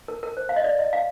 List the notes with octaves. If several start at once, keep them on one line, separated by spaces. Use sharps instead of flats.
A#4
A#4
C5
F5
D#5
D5
D#5
F5